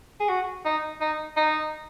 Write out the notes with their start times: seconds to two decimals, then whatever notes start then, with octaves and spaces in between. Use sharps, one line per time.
0.20 G#4
0.29 F#4
0.65 D#4
1.01 D#4
1.37 D#4